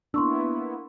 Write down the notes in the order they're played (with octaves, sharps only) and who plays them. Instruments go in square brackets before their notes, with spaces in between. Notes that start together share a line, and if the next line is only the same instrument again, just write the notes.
[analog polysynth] A#3 B3 E4 [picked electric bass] D4 [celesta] C6 C#6 E6